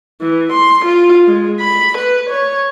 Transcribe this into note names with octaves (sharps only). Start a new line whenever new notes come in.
E3
C6
F4
G#3
B5
B4
C#5